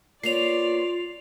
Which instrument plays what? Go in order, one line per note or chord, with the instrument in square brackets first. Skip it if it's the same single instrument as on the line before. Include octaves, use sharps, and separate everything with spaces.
[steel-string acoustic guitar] A#3 B3 C#5 [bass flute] F4 [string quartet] D5 [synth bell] C7 F7